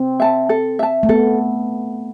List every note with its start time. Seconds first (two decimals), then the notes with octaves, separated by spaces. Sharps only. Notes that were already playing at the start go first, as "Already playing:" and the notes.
Already playing: C4
0.20 E5 A5
0.49 A4
0.79 E5 A5
1.03 A3
1.09 B3 A4